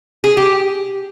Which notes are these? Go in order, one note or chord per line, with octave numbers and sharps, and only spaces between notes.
G#4
G4